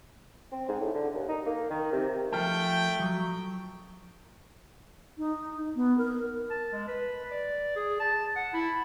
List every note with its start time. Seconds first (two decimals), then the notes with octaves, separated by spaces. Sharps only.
0.52 C4
0.68 G#2
0.80 A2
0.93 D3
1.14 D#2
1.28 D#4
1.46 A#3
1.70 D#3
1.92 C3
2.32 F3 A3 F4 G5 G#5
2.99 F3 F#3
5.18 D#4
5.76 B3
5.98 A#4
6.50 A5
6.72 G#3
6.88 B4
7.31 D5
7.76 G#4
8.00 A5
8.36 F#5
8.53 E4